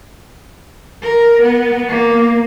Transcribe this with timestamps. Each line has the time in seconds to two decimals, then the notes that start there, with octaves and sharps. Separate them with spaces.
1.03 A#4
1.43 B3
1.89 A#3